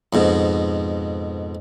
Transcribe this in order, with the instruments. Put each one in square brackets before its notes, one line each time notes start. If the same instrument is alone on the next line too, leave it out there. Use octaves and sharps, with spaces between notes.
[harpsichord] F2 G#2 B2